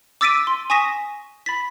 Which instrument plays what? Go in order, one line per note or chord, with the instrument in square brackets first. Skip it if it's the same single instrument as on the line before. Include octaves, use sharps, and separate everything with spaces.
[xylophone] D6 E6 A6 B6 D7 D#7
C6
G#5 C#6 D#6 A#6 B6 E7
B5 A6 B6